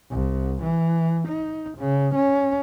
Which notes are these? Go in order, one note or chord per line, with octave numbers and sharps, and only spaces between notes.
C2
E3
D#4
C#3
C#4